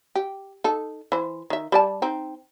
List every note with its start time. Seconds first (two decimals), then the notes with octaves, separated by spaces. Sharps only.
0.15 G4
0.64 D#4 A4
1.12 E3 C5
1.50 D#3 E5
1.72 G3 D5 A5
2.02 C4 D#4